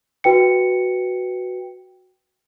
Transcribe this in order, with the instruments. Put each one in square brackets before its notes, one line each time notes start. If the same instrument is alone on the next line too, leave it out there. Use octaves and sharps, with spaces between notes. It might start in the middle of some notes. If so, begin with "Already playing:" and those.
[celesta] F#4 B4 G5 C#7